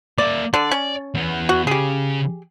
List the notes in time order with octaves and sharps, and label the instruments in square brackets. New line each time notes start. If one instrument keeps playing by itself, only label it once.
[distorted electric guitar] A#3 E5 [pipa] D5
[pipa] D3 [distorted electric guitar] D5
[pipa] C#4
[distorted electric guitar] E2 B3
[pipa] F#4
[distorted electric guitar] C#3 [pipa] G4 G#4